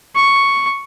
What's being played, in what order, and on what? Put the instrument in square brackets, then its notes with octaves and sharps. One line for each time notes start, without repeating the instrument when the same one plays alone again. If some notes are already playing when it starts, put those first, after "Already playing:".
[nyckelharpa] C#6